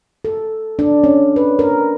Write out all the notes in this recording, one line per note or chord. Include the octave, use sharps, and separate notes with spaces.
A4
D4
C#4
B4
A#4